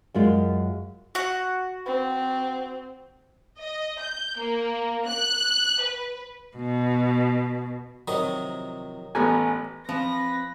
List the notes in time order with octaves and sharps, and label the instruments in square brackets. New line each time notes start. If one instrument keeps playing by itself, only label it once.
[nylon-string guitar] F#2 G#3 F4
[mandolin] F#4 F#5
[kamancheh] C4
[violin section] D#5
G6
A#3
F#6
B4
[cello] B2
[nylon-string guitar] C3 F3 [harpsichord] D#3 F#3 D#5
[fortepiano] A1 B3 [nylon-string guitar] A3 G4 A4 [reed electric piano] G#5 A#5
[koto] F3 [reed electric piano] C4 [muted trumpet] B4 [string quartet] A#6